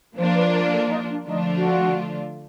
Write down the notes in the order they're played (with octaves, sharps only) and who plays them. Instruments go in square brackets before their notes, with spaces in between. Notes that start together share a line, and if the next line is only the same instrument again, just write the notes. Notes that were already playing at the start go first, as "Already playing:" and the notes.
[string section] F3 A#3 D4 F4 [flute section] C5
[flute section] B4
A#4
A4
D#4
D4
[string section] D3 F3 A3 D4 F4 [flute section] D#4
[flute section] F#4